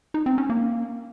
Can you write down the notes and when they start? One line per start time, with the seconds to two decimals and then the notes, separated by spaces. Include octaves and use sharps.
0.14 D#4
0.26 C4
0.38 C#4
0.50 A#3